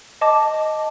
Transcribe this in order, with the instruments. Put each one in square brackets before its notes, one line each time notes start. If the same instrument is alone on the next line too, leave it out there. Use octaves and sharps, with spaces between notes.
[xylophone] D#5 A5 D6